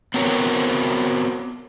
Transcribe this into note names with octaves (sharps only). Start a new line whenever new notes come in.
B3 C4 F#4 A#4 C#5